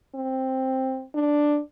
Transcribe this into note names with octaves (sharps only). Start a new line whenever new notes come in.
C4
D4